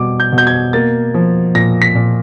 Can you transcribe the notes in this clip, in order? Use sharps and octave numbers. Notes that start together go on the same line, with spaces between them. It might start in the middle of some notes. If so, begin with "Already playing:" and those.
Already playing: B2 G3 D6
G6
B2
G6
G#6
A#3 A6
F3
A#2 A#6
B6
A#2